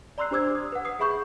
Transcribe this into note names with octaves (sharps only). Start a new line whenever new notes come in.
D5 A#5 C6 E6 F#6 C7
D4 G4 C5 D6 E6 G#6
D#6
B4 F#5
D#6 C7
G#4 E5 B5 C#6 G6